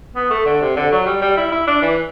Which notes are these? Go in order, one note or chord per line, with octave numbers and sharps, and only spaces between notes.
B3
A3
D3
C3
D3
F#3
G3
G3
E4
E4
D4
E3